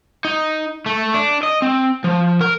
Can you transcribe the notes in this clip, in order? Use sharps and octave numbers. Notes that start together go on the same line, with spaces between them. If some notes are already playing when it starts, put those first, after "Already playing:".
D#4
A3
D4
D#5
C4
F3
A#4